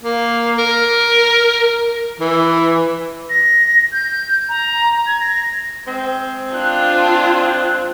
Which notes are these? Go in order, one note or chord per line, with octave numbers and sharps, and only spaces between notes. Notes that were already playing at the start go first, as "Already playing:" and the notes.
A#3
A#4
E3
A#6
G6
A#5
G#6
A#6
G#3 C4
D4 F4 F#6